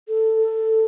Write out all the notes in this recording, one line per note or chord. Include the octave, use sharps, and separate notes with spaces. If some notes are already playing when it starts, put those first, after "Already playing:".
A4